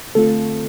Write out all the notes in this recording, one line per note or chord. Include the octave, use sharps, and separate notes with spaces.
D3 A3 C4 F4 A4